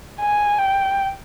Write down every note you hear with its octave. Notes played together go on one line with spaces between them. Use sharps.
G#5
G5